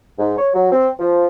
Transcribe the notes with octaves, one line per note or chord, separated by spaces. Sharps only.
G#2
C#5
F#3
C4
F3